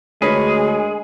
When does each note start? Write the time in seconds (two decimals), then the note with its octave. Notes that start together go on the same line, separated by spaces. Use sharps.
0.22 D2 G#3 G#4 A#4 B4 C#5